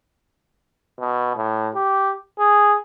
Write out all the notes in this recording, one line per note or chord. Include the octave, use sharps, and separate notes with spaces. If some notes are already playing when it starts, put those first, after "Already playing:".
B2
A2
G4
G#4